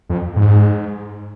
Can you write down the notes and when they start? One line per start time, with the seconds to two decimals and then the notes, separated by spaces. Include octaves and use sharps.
0.09 F2
0.36 G#2